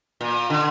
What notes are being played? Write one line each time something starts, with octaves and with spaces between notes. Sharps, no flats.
A#2
D3